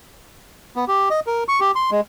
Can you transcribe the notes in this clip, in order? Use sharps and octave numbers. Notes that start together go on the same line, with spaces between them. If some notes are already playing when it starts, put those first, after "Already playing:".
B3
G4
D#5
A#4
C#6
G4
C6
G#3